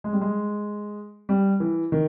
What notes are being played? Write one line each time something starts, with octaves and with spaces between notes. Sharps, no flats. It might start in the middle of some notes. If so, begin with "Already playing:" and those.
G#3
G3
G#3
G3
E3
D#3